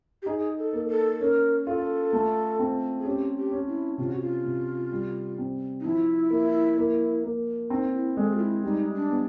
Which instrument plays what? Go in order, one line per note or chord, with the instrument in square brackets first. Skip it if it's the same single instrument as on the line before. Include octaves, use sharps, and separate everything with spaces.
[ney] G4
[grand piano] D#4 [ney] G#4
[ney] A4
[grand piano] A#3
[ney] A4
[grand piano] C#4 [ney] A#4
[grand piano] F4 [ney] A4
[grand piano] A3
C4
[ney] G#4
[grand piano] C#4 [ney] G4
[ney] G4
[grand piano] C#4
[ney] E4
[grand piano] C3 [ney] F4
[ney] F#4
F4
[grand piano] C3
G3
C4
[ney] D#4
[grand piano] F3 [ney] E4
[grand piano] A#3
A#3
A#3
[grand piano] C4 [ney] D#4
[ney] E4
[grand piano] G#3 [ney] A4
[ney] F4
E4
[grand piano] G3 [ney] D#4
[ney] D4
[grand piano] B3